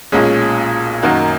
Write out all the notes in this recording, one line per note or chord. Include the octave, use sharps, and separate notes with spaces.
B1 A#2 G#3 C#4 G#4
F#2 D#3 A#3 D#4 F#4